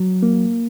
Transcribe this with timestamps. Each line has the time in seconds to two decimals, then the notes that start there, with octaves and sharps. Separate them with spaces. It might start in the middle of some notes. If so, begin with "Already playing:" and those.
Already playing: F#3
0.23 A#3